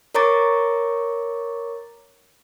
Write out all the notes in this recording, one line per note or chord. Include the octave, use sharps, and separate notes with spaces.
A#4 C#5 A#5 C#6 D6 A6